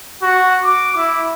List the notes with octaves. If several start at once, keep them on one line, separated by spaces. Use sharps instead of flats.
F#4
D6
E4